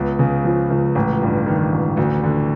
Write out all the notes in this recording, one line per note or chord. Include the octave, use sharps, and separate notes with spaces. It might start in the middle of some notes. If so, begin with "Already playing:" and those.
Already playing: C#2 B3
C#3
F3
C#2
A1
G2
D#3
A1
D2
D3